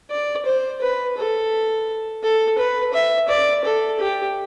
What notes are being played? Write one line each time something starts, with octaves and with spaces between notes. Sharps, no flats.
D5
C5
B4
A4
A4
B4
E5
D5
A4
G4